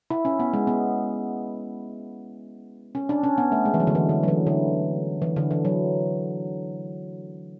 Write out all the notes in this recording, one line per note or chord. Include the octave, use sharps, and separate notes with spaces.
E4
C#4
B3
G#3
B3
C#4
D4
C#4
B3
A3
G#3
E3
F#3
D3
E3
D3
F#3
E3
D3
E3
D3
E3
F#3